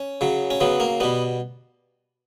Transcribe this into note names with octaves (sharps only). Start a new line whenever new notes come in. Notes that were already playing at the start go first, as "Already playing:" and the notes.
Already playing: C#4
C#3 F#3
C#4
C#3 F#3 B3
A#3
B2 G3 B3